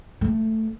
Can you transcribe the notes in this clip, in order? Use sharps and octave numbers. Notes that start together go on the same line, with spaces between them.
A3